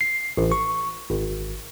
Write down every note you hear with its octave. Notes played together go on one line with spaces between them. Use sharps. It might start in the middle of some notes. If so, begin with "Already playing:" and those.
C7
A1
C#6
G#1